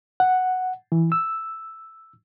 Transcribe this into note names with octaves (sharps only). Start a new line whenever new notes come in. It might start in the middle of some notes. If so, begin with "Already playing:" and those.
F#5
E3
E6